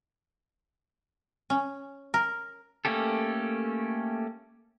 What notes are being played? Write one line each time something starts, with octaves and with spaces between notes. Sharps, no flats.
C#4
A#4
A3 A#3 C#4 G4 A4